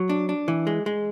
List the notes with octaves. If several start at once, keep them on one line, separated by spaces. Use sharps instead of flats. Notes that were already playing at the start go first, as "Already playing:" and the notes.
Already playing: F#3
D4
D4
E3
G#3
G#3